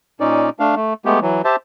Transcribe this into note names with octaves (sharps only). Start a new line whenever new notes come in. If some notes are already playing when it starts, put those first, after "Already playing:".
A#2 C#4 D#4 D5
A3 D4 F5
A3
G#3 A3 B3 G4
E3 F#3
G4 C5 E5 A5